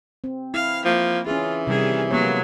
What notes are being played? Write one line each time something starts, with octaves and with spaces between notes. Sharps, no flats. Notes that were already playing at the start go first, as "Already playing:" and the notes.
C4
E4 F5
F3 A#3
E3 C#4 F4 G#4
C3 D#3 G3 G#4
F#3 G#3 A#3 B3 C#5